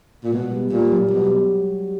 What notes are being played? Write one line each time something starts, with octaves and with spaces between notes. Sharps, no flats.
A#2
B2 G#3
G3
A#2 G3
F#3
B2 G3